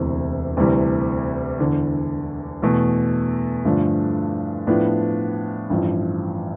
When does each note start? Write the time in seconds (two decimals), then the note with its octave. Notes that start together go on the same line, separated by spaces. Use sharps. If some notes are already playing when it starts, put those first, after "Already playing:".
Already playing: E1 D2 C3 E3
0.57 D2 C3 E3 G3
1.59 E1 E2 D3
2.62 E2 B2 A3
3.65 G2 D3 F3 A3 D4
4.67 A2 F3 B3 D4
5.70 A1 G2 F3